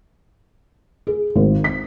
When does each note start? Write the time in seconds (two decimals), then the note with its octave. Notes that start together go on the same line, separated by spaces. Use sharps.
1.07 G#4
1.36 G#1
1.64 B6